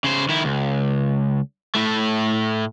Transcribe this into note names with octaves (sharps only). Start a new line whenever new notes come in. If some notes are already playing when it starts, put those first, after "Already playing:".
C#3 C5
D#3 E4
C#2
A2 A3